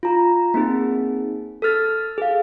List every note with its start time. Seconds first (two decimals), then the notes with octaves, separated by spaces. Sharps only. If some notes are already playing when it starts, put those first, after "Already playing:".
0.03 F4 A#5
0.54 A#3 C4 D#4 G#4
1.62 A4 E6 F6 A6
2.18 G#4 F5